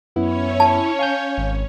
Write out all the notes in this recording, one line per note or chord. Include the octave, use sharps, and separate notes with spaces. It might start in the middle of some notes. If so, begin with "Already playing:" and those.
F#2 B3 C#4 E4 C#5
A5
F5 G#5 G6
G#1